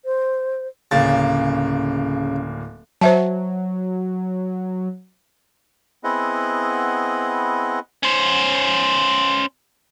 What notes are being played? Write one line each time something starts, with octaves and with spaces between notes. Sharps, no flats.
C5
D1 C#3 A#3 A6
F#3 C5 E5 A5
B3 C4 E4 G#4 D#5 F#5
C#4 C5